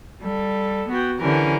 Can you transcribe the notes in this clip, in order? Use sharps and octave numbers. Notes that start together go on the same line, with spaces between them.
G3 A4
B3 F#4 G5
D3 E3 C#4 G4 A#4 B4